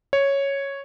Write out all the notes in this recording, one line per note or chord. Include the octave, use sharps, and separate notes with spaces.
C#5